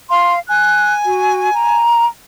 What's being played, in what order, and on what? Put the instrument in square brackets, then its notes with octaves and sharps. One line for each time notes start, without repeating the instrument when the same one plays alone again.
[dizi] F5 [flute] C6
[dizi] G#5 [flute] F#6
[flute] F#4
A#5